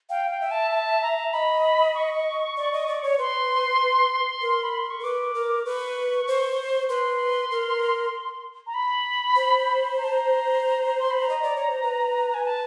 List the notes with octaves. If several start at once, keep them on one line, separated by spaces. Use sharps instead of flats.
F5 G5
G5
E5
A5
A5
A#5
D#5 B5
C#6
D5
D#5
D5
C#5
B4 C6
A#4
B5
C6
C#6
A#4
B4 D6
A#4
B4 C#6
C5
B4 C6
A#4
A#5
B5
C5
A#5
A5
A#5
C6
B5
A#5
D#5
D5
C#5
C5
B4
G#5
A5